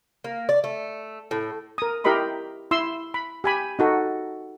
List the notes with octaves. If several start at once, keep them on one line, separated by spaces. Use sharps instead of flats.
A#3
D5
A3
A2
A#4 D#6
E4 G4 A#4 D#5 B5 C6
E4 C6 E6
B5
G4 G#5 B5
D#4 F#4 A4